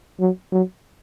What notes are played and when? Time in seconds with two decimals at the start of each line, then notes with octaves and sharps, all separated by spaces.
0.20 F#3
0.52 F#3